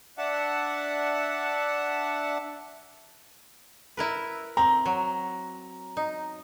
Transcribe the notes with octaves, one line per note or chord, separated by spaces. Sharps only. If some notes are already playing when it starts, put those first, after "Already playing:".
D4 E5 F#5 A5
E4 A#4 B4
C4 A#5
F#3
D#4